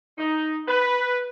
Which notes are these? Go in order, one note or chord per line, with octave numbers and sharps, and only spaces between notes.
D#4
B4